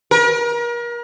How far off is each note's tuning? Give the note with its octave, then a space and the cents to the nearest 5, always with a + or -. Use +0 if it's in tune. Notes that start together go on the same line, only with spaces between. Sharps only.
A#4 +35